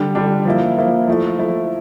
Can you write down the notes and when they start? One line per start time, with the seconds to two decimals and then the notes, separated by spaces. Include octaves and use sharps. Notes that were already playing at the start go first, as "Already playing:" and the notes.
Already playing: D3 G3 D4
0.15 D3 G3 D4
0.45 F3 A#3 E4
0.77 F3 A#3 E4
1.07 F3 A3 E4
1.39 F3 A3 E4